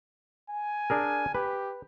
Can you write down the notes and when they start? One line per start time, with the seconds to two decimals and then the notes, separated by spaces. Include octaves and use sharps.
0.50 G#5
0.90 D4 G#4 A#4
1.35 G4 B4